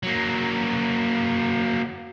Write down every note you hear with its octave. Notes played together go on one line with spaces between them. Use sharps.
F#3 A#3